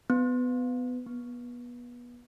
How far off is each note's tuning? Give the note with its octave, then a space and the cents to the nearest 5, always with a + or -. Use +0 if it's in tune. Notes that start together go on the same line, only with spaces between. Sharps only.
B3 +20
B3 -25